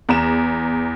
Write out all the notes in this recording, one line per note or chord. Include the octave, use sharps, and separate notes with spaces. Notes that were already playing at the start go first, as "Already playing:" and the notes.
E2 A#5 E7